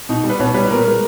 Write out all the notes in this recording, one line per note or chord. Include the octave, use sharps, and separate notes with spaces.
B2 D#4
G3
B4
B2 C#5
G3 B4
A#2 A#4
G#3